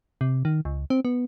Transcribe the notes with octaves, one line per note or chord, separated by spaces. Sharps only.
C3
D#3
C#2
C4
B3